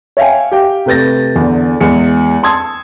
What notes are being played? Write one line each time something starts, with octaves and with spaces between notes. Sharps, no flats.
C#5 E5 F5 G5 G#5
G4 F5 G5
C3 A3 B4 G6 A6 A#6
E2 D3
E2 G#3 C#7
A5 C6 D#6 E6 G#6